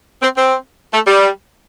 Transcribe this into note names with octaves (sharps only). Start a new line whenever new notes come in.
C4
C4
A3
G3